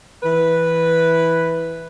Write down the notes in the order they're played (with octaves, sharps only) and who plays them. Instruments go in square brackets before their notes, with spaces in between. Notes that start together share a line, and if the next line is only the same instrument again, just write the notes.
[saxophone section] E3 B4